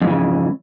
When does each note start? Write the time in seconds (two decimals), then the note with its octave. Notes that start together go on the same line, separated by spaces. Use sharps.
0.02 F2
0.04 G#2
0.07 E3
0.10 C#3